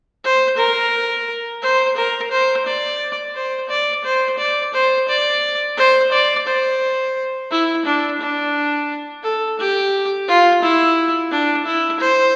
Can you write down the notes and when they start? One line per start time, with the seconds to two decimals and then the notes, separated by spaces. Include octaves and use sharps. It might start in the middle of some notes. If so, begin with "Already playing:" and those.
0.24 C5
0.57 A#4
1.62 C5
1.97 A#4
2.31 C5
2.66 D5
3.35 C5
3.69 D5
4.04 C5
4.38 D5
4.74 C5
5.08 D5
5.77 C5
6.12 D5
6.47 C5
7.51 E4
7.85 D4
8.20 D4
9.23 A4
9.59 G4
10.28 F4
10.63 E4
11.31 D4
11.66 E4
12.00 C5